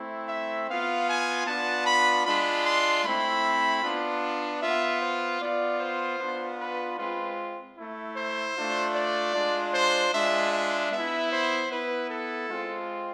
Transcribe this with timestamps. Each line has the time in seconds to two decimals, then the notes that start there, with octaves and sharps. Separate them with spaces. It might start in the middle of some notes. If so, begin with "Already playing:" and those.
Already playing: A3 C4 E4
0.28 E5
0.68 B3 F4 F5
1.07 G#5
1.47 B3 D4 F4 A5
1.86 B5
2.26 G#3 D4 F4 B5
2.65 C6
3.05 A3 C4 E4 B5
3.83 B3 D4 F4
4.62 B3 F4 E5
5.01 C5
5.41 B3 F4 D5
5.80 C5
6.20 B3 D4 F4
6.59 B4
6.98 G#3 C4 F4 B4
7.77 A3 E4
8.17 C5
8.56 A3 D4 F4
8.95 D5
9.35 G#3 D4 F4
9.74 C5
10.13 G#3 D4 F4 E5
10.53 E5
10.92 B3 E4 E5
11.32 C5
11.71 B3 E4 B4
12.10 A4
12.50 G#3 C4 F4